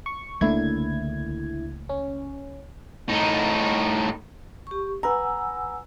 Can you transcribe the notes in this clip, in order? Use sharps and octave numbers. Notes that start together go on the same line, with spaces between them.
C#6
C#2 D3 A3 A#3 E4 G#6
C#4
A2 D#4
G4 C#6
B4 F#5 G#5 A#5 E6